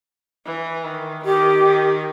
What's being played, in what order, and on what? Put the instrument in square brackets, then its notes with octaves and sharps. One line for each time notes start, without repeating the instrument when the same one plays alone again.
[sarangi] E3
D#3
[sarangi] D#3 [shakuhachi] G4
[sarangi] D#3